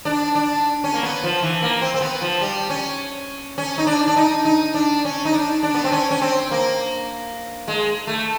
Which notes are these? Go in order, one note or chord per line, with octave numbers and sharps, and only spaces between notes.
D4
D4
C#4
A#3
B3
F3
E3
A#3
C4
C4
B3
F3
G3
C#4
C#4
D#4
D4
D4
D#4
D#4
D4
C#4
D#4
D4
D4
B3
C4
C#4
C#4
C4
A#3
G#3
A3